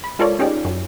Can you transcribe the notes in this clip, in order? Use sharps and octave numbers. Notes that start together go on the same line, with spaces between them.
B5
G#3 F4 A4 A#4 C#5 D5
C#4 D#4 G4 G#4 D5
F#2